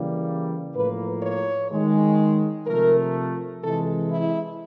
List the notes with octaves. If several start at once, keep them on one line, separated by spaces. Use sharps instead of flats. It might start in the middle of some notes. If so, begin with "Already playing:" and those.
Already playing: C#3 E3 G3 A#3
A2 F3 A#3 B4
C#5
D#3 G#3
C3 F3 A3 A#4
C3 E3 G#3 A4
E4